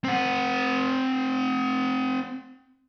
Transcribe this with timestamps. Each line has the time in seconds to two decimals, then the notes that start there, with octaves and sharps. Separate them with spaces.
0.04 C4 F#5